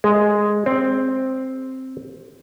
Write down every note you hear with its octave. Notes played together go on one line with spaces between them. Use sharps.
G#3
C4